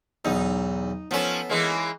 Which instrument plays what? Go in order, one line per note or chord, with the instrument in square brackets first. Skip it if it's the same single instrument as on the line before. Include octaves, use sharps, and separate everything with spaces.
[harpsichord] B1 E2 [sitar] D#4
[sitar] F3 C#4 [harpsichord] B3 A4
[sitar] E3 G#3 A#3